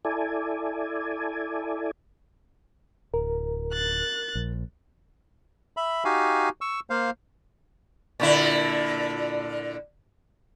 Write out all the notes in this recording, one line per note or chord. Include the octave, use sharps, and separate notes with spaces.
E4 A4 D5 G#5
D1 A#4
F#6 A6
A#1
E5 B5
D#4 F#4 G4 F5 G#5
C#6 E6
A#3 C5 F5
A#2 D3 E4